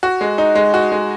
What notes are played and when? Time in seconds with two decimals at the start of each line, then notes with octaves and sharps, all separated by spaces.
0.03 F#4
0.21 G#3
0.38 D#4
0.55 G#3
0.74 F#4
0.92 G#3